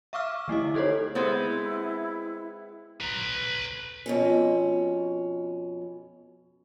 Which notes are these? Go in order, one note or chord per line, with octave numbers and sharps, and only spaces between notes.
E5 F5 C#6 D6 E6 F6
D3 A3 E4 D#5
D#4 G4 A4 C5 C#5
G#3 B3 C4 E4
B4 A#5
F2 B2 C#4